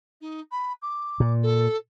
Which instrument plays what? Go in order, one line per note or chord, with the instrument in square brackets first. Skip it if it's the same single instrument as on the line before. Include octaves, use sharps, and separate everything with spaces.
[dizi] D#4
B5
D6
[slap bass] A#2
[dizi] A4